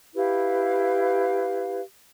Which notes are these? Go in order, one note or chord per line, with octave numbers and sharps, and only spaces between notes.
E4 G4 B4 F5